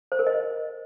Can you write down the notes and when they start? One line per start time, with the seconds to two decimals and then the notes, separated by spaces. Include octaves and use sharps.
0.12 C5
0.19 A#4
0.27 D#5